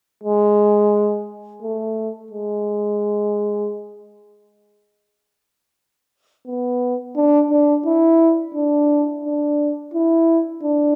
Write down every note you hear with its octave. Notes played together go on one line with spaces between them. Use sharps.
G#3
A3
G#3
B3
D4
D4
E4
D4
D4
E4
D4